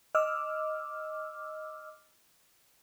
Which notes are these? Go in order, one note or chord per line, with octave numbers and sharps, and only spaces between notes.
D#5 D6 E6 F6